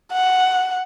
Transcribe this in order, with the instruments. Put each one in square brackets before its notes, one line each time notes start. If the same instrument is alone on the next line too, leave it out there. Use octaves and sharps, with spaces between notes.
[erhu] F#5